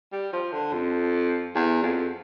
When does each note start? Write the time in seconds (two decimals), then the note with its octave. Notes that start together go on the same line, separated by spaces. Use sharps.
0.12 G3
0.33 F3
0.52 D3
0.73 F2
1.55 E2
1.82 F2